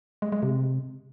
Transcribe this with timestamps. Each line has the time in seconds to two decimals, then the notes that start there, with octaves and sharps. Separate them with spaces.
0.22 G#3
0.32 G#3
0.43 C3